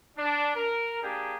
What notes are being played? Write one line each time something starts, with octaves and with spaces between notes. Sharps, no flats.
D4
A#4
A#3 D4 G4 G#4